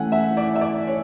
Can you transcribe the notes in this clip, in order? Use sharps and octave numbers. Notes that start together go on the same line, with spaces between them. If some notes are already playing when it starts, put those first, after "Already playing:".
Already playing: E3 A3 C#4 E4 F#5 G#5
E5
D5
E5
D5
C#5